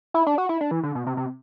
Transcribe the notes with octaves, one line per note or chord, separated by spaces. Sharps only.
E4
D4
F#4
E4
D4
E3
D3
B2
C3
C3